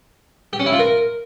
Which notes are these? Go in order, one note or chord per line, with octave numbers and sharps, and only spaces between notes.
G4
C#4
E4
F4
A#4